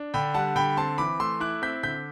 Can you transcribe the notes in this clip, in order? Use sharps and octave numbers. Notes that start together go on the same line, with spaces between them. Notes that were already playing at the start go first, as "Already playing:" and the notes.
Already playing: D4
D3 G5 B5
G3 F#5 A5
D3 G5 B5
C4 A5 C6
E3 B5 D6
A3 C6 E6
E4 D6 F#6
C4 G6 B6
D3 G6 B6